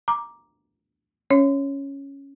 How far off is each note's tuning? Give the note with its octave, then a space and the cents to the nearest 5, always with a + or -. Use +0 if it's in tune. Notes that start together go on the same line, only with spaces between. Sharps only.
A#5 +10 D6 +0
C#4 +0 C#5 -10 E5 +30